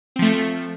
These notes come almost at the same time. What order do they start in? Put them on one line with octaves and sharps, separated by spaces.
C4 F3 A3